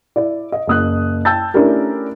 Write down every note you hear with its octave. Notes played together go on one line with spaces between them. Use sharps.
E4 D5
D#5
F#1 D#6 F#6
G5 A5 E6 G6 A6
A3 C#4 D4 E4 G4 A#4